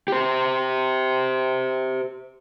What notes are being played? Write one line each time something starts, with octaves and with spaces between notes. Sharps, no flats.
G4 C5